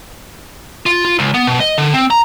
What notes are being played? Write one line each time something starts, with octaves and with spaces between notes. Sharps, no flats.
F4
F4
C#2
B3
B2
D#5
D3
C4
A#5